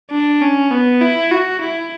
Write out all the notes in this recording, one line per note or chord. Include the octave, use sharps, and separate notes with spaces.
D4
C#4
B3
E4
F#4
E4